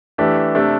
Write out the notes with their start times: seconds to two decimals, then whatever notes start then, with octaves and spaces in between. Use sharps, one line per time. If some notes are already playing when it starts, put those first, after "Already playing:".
0.18 E3 A3 D4 G4
0.55 C3 A3 D4